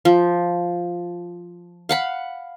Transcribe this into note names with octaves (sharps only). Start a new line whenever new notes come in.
F3
F5 F#5 B5